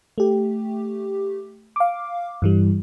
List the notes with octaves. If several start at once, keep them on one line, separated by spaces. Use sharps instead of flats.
A3 G4
F5 D6
G2 E3 G3